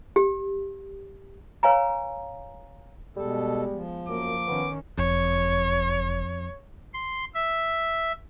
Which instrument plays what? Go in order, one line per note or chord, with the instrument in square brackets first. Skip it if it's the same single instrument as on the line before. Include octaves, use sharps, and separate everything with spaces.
[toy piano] G4
B4 C#5 F5 G#5 A#5
[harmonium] B2 A4 [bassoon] G3 [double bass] G#3 B3
[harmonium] F3
[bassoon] F#2 [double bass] A#3 [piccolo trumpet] D6
[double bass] D#3 C#4 [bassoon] B3
[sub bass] F#1 [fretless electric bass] F2 [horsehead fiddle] C#5
[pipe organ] C6
E5